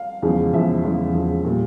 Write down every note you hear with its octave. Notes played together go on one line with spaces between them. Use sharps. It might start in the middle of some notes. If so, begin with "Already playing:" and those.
Already playing: F5
E2 C#3 F3 G#3
E2 C#3 F3 G#3 E5
E2 C#3 F3 G#3
E2 C#3 F3 G#3
A#2 G3